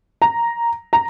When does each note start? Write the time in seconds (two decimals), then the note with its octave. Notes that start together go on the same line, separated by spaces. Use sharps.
0.22 A#5
0.93 A#5